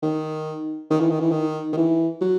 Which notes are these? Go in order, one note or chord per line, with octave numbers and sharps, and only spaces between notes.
D#3
D#3
E3
D#3
E3
D#3
D#3
E3
F#3